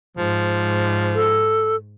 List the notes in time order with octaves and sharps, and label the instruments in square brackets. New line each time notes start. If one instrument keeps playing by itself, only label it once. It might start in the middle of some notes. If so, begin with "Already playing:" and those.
[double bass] G#2 [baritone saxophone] F3
[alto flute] A4